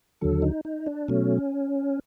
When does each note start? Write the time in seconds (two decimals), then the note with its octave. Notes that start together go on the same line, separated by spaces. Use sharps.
0.21 D#2 D3 F#3 A4
0.42 D#4
0.65 D#4
0.86 D4
1.08 B2 F#3 A3 C#4